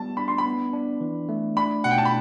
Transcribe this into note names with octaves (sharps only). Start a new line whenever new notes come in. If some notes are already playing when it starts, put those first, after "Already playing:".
Already playing: G3 B3 A5
D4 B5
C6
B5
B3
D4
E3
A3
D4 B5
B2 F#5
G5
A5
B5